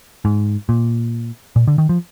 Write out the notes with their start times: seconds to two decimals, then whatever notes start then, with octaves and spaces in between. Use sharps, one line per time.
0.25 G#2
0.69 A#2
1.56 A#2
1.67 D3
1.78 D#3
1.89 F3